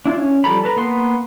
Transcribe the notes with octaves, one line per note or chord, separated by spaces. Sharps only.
D4 E4 F4
C#4
F3 G3 A4 A#5 B5
A4 B4 A#5
A#3 B3 C6